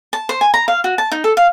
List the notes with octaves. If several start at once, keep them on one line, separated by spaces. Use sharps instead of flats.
A5
C5
G#5
A#5
F5
F#4
A5
D#4
A4
F5